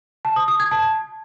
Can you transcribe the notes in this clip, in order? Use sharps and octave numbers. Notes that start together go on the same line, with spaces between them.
A5
D#6
D#6
G#6
A5